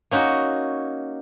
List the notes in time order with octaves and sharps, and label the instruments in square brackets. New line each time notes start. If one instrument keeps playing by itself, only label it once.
[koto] A#3 C#4 D#4 F#4